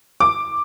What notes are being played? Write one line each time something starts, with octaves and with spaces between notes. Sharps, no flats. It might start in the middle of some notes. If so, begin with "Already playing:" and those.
D6